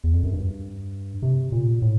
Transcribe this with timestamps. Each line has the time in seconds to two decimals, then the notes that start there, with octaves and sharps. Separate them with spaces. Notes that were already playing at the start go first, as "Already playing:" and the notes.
0.04 E2
0.14 F2
0.23 F#2
0.33 G2
1.22 C3
1.52 A#2
1.82 A2